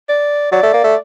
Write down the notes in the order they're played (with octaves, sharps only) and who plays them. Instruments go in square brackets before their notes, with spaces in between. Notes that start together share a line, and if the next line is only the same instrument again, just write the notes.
[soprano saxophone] D5
[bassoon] F#3 [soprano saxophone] D5
[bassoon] A3
A#3
A3